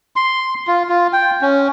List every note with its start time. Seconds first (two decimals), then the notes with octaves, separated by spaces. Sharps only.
0.16 C6
0.67 F4
0.89 F4
1.13 G5
1.42 C#4